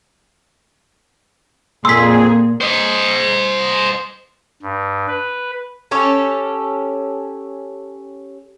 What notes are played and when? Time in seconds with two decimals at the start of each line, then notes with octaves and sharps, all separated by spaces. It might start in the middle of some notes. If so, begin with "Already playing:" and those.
1.85 F2 A#2 G#4 C6 E6 B6
2.61 C5 D#5
4.62 G2
5.08 B4
5.91 C#4 G4 A4 C#5